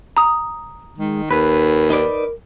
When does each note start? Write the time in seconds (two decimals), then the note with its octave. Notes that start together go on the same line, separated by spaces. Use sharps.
0.17 A#5 D#6
0.98 D#3 G#3
1.31 D#2 A#4 B4
1.90 D#4 B4 D5